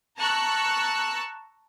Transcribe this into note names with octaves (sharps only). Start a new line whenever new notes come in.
A5 A#5 C#6 E6 F#6